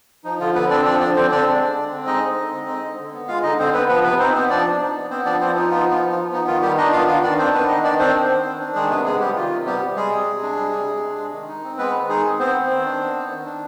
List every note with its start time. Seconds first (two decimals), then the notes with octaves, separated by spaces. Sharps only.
0.24 F3 D#4
0.40 D3 F4
0.55 D3 B3 B4
0.70 C4 D4 D5
0.85 F3 D4 D5
1.00 D3 D4 D5
1.16 D3 C4 C5
1.31 C4 D4 D5
1.46 G#3
1.61 D3
1.76 D3
1.91 C4
2.06 G#3 D#4 D#5
2.22 D3
2.37 D3
2.52 C4
2.67 G#3
2.83 D3
2.99 D3
3.13 B3
3.28 G#3 F4 F5
3.43 D3 D#4 D#5
3.59 D3 C4 C5
3.74 B3 B4
3.89 F3 B3 B4
4.04 C3 B3 B4
4.19 C4 D#4 C5
4.34 B3 C4 C5
4.50 F3 D4 D5
4.65 C3
4.80 D#4
4.95 B3
5.10 B3 C4 C5
5.25 F3 D4 D5
5.41 F3 C4 C5
5.56 D#4 F4
5.71 B3 F4
5.86 F3
5.91 F4
6.02 F3
6.12 F4
6.17 D#4
6.32 B3 D#4
6.47 D#3 F4
6.62 D#3 G3 G4
6.77 D4 D#4 D#5
6.93 B3 F4 F5
7.08 D#3 F4 F5
7.23 D#3 D4 D5
7.38 C4 D4 C5
7.53 B3 B4
7.68 D#3 D#4 D#5
7.84 D#3 D4 D5
7.99 C4 D4 C5
8.15 B3
8.29 D#3
8.45 D#3
8.60 D4
8.75 D#3 G#3 G#4
8.90 C3 B3 B4
9.05 G#3 B3 G#4
9.20 G3 G4
9.36 D#3 F4
9.51 C3
9.66 G3 B3 G4
9.82 G3
9.96 G3 G#3 G#4
10.11 C3
10.27 C3
10.43 D4
10.57 G3
10.73 C3
10.87 C3
11.03 D4
11.18 G#3
11.33 D#3
11.48 D#4
11.64 C4
11.78 G#3 B3 B4
11.94 D#3
12.09 G#3 D#4 G#4
12.25 C4
12.39 B3 C4 C5
12.54 D#3
12.70 D#3
12.85 D4
13.01 B3
13.15 D#3
13.30 D#3
13.45 D4